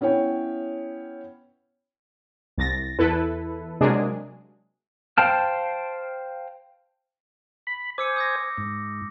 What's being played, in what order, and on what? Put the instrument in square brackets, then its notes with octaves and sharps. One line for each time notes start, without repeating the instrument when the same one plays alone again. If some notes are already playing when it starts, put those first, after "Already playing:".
[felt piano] B3 C#4 E4 C#5 G5
[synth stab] C2 A6 A#6
E2 E4 A4 B4
C3 F#3 G#3 A#3 D4 G#4
[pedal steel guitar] C5 F5 G5 A5 F6
[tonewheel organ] B5
[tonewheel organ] C5 G#5 [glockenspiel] D6 E6 C#7
[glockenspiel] D#6 G6 A#6
[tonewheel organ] G#2